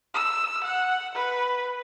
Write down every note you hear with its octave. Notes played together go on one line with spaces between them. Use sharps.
E6
F#5
B4